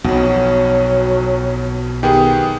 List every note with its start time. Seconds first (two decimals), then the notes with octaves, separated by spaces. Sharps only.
0.04 B1 F2 B2 F#3
2.03 D#3 B3 G4 G#4